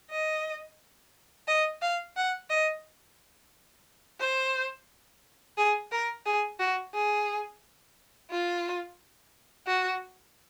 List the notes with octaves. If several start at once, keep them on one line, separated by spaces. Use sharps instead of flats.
D#5
D#5
F5
F#5
D#5
C5
G#4
A#4
G#4
F#4
G#4
F4
F#4